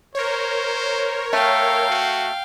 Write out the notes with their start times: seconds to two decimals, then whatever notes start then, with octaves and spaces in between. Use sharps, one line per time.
0.15 A#4 C5 C#5
1.33 A3 F5 G5
1.89 F#4